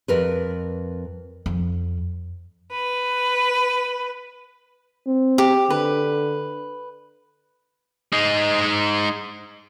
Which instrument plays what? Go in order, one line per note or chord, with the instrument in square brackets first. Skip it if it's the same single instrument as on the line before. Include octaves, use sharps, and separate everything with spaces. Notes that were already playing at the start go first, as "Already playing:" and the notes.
[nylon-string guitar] F2 A#4 B4
[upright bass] F2
[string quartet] B4
[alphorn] C4
[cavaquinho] G4
[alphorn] D3 [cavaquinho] B4
[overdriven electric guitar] G#3 D#4